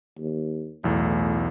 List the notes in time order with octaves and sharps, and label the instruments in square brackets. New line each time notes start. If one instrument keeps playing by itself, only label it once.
[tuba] D#2
[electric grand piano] B1 E2 [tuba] A2